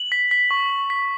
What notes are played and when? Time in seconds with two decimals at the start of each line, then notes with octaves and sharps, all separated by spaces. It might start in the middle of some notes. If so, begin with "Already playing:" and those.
Already playing: F#7
0.12 B6
0.31 B6
0.51 C#6
0.70 C#6
0.90 B6